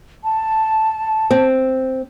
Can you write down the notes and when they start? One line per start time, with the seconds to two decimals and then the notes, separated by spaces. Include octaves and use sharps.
0.24 A5
1.31 C4